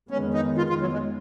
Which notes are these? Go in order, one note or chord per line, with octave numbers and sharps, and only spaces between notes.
F2 D#3 G#3 B3 C#4
D#4
F4
F4
F#3
G#3